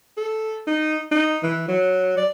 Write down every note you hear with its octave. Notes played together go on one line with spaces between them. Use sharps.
A4
D#4
D#4
E3
F#3
D5